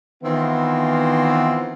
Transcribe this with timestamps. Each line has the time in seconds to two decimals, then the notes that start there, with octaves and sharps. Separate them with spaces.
0.24 D#3 E3 B3 C4 E4 F4